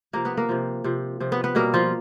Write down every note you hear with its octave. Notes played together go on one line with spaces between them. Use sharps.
C3 F3 A#3 A#4
B3 B4
A#3 A#4
C3 F3
C3 F3
C3 F3
B3 B4
B3 B4
B2 G3 A#3 A#4
F3 F4